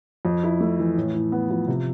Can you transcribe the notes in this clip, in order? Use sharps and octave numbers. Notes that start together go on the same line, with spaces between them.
F2
E4
A3
E3
A2
A2
B3
F3
C3